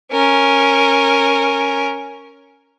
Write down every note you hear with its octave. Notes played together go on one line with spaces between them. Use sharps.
C#4 A#4